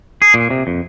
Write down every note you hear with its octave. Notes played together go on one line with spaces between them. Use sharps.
G#4
A#2
C3
F2